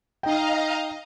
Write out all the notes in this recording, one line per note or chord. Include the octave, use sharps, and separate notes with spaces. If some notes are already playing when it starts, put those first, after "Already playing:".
D#4 D#5 F5 G5 A#5